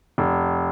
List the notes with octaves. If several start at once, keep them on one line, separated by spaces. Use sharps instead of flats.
F1